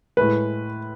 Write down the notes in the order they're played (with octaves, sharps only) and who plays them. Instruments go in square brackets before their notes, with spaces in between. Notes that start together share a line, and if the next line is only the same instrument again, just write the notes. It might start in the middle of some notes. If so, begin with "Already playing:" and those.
[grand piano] A2 G#3 B4